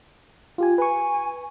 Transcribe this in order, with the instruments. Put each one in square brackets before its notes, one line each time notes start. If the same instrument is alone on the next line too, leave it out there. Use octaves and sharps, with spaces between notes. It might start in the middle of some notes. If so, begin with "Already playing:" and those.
[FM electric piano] F4 G4 G#5
[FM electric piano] B4 C#6 [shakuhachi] G#5